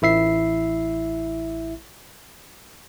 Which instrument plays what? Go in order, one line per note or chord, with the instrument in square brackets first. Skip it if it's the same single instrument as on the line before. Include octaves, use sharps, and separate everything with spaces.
[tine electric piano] A1 E4 E5 C7